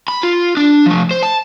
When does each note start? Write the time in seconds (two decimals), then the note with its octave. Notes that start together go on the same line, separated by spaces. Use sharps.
0.08 B5
0.23 F4
0.57 D4
0.86 F3 A3
1.11 C5
1.23 A5